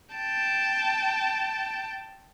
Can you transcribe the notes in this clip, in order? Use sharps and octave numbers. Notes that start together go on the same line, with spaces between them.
G5 A5